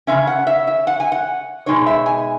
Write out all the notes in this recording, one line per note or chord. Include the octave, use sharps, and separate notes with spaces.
C#3 G#3 C#4 E5
F#5
E5
E5
F#5
G#5
F#5
B2 G#3 D#4 C#5
E5
G#5